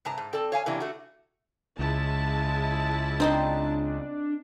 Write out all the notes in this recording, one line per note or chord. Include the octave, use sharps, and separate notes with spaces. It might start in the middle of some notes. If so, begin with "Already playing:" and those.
G2 C3 A5 A#5
G#2
C4 A4 D5 A5
C#5 F5 G#5
C3 E3 A#3 C#4 D4
A3 F#4
C#2 G#3 E4 A5
C4 D4 D#4 C5